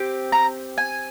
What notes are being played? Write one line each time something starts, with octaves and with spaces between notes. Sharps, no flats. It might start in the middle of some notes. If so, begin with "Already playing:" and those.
Already playing: C4 G4
A#5
G#5